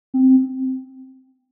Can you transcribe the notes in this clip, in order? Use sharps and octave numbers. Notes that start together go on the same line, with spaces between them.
C4